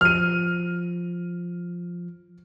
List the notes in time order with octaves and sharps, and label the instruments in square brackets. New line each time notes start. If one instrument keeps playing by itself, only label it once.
[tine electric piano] F3 [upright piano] F6 D#7